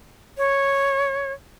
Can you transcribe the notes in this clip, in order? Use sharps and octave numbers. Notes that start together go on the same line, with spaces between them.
C#5